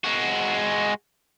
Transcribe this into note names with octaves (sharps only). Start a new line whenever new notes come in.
G#3 F#4